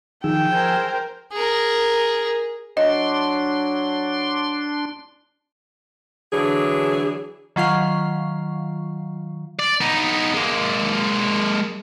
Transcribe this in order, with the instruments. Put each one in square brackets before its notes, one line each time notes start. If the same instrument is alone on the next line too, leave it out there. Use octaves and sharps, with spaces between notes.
[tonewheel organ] D#3 [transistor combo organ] F3 G#4 E6 [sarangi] G5
[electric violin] A#4 C5 [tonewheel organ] G#5
[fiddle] G#4 A#4
[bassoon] F#3 [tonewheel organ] D4 C6 [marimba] D#5
[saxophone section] D3 E3 F#3 D4 G#4
[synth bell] D#3 F#3 F4 F5
[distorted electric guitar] D5
B3 D#4
G#3 A#3